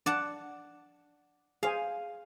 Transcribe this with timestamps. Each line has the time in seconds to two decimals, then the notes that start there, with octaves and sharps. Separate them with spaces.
0.06 D4 D5 F#5 A5
1.63 G#4 C5 F5 G#5